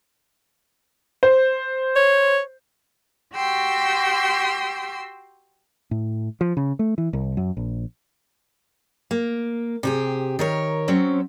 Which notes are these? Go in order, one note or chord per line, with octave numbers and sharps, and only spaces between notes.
C5
C#5
F#4 G4 G5 C6 E6
A2
F3
C#3
A3
E3
C2
F#2
A#1
A#3
C3 G4 G#4
D#3 A#4 C#5
F#3 C4 C#4